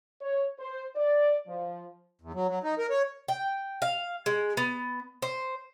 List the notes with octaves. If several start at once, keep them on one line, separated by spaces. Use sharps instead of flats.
C#5
C5
D5
F3
E2
F#3
F#3
D#4
A#4
C#5
G5
F5
G#3
B3
C5